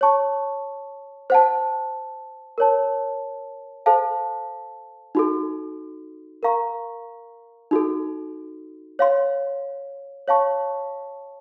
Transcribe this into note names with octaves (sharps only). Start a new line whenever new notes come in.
C#5 A5 C#6
C5 F#5 A5
A#4 C#5 A5
A4 C5 F5 A5
D#4 F#4 A4
A#4 F5 A#5 C#6
D#4 F#4 A4
C#5 F5 C6
C#5 F5 A5 C#6